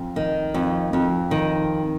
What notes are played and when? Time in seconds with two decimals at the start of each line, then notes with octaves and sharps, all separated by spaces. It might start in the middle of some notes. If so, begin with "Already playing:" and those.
Already playing: F2
0.16 D#3
0.54 F2
0.93 F2
1.31 D#3